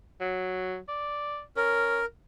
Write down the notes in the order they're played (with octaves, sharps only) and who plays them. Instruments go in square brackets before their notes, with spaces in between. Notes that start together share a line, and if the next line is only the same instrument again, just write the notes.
[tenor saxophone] F#3
D5
[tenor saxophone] C#4 [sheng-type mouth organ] A#4